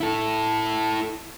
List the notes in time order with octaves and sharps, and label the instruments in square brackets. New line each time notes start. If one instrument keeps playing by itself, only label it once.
[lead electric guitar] E4 A4